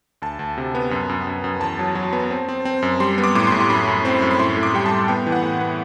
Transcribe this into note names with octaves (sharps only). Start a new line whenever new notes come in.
D2 A5
D2
C3
B3
F#2
F#2
F#2
F#2
E2 A5
F#3
F#3
B3
C4
C4
C4
F#2
G3 C6
B3
D6
A2 D6
C6
A2
C6
F#2 B5
F#2
C4
F#2
B5
A2 C6
A2
D6
G3 G5
A5
A2
B3 G5
E3
F#5
A2
B3